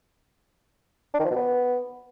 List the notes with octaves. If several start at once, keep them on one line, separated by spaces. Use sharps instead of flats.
D4
D#3
F3
B2
B3